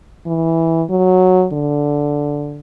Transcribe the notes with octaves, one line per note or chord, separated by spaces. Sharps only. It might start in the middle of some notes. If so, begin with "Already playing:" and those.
E3
F#3
D3